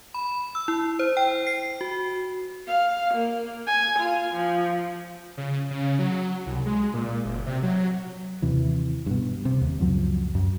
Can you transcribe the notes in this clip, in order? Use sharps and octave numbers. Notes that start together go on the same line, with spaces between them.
B5
E6
E4
C5
G5
C7
F#4
F5
A#3
G#5
F4
F3
C#3
C#3
F#3
C2
G#3
A#2
F#1
C3
F#3
D#2 C3 E3
G2 B2
C3
D#2
C#2 F#2 F3 F#3
F#2